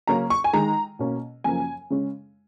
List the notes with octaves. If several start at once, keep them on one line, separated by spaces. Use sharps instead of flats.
C#3 F#3 A#3 C#4 A#5
C#6
G#5
D#3 G#3 D#4 A#5
B2 A#3 C#4
F#2 C#3 F3 A#3 G#5
C#3 G#3 C#4